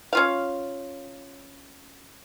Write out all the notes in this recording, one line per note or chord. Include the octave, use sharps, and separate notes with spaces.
C#4 F4 F5